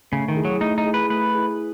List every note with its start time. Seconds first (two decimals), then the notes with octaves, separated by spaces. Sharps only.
0.12 C#3 A3
0.28 D#3
0.37 E4 G#4
0.45 F#3
0.61 A3 D#4
0.78 D#4
0.86 E4 G#4
0.94 B4
1.10 A3 B4
1.35 E4 G#4